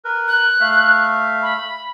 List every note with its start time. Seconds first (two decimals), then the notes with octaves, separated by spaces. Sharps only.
0.05 A#4 B4
0.28 F#6
0.61 A3 E5 F5
1.42 B5